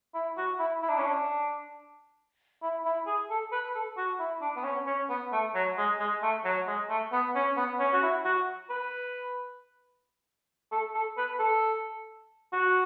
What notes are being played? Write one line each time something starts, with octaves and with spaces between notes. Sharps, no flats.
E4
F#4
E4
E4
D4
C#4
D4
E4
E4
G#4
A4
B4
A4
F#4
E4
D4
B3
C#4
C#4
B3
A3
F#3
G#3
G#3
A3
F#3
G#3
A3
B3
C#4
B3
C#4
F#4
E4
F#4
B4
A4
A4
B4
A4
F#4